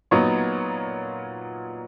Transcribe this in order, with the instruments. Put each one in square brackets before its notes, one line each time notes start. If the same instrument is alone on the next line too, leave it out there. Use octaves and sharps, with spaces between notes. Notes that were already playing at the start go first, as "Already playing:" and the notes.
[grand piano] A#2 F#3 B3 D#4 C#5